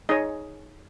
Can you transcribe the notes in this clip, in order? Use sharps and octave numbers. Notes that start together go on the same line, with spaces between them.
D#4 G#4 C#5 D#5